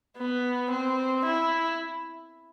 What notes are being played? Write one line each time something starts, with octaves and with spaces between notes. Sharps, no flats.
B3
C4
E4